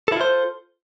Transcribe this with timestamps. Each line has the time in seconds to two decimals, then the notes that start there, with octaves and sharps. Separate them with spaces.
0.08 A4
0.12 E4
0.16 F4
0.21 C5